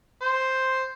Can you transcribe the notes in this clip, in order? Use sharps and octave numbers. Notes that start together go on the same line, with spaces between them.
C5